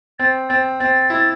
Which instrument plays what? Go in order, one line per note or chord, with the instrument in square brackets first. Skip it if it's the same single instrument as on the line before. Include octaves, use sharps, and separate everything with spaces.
[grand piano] C4 [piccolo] A6
[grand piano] C4 [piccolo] A6
[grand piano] C4 [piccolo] A6
[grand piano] E4